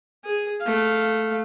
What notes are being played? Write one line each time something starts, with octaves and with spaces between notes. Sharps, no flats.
G#4
A3 F5